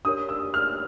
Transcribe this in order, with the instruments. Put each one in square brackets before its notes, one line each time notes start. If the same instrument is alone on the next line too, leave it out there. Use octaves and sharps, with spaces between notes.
[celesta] D4 G4 A#4 C#5 [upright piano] D#6
[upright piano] E6
F6